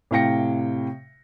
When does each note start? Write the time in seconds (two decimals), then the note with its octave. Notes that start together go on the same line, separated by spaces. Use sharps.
0.11 A2 C3 F5 G5 A#6 C#7